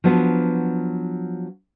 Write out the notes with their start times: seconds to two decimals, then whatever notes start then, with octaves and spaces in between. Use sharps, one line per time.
0.04 F3 F#3 B3 D4